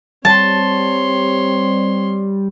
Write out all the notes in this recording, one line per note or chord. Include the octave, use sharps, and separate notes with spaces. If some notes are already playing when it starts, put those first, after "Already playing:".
G3 C4 C#5 A5 C6